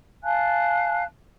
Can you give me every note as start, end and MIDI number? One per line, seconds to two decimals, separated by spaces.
0.23 1.02 77
0.23 1.02 80
0.23 1.02 81
0.23 1.02 90